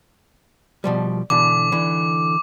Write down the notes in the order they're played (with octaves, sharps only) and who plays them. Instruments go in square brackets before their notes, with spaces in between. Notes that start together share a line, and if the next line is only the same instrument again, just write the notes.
[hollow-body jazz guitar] B2 F3 G3
[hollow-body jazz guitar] B2 D3 E3 [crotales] D6
[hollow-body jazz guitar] D3 E3